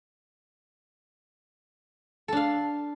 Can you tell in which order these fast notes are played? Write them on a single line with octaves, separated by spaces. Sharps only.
A4 D4 F5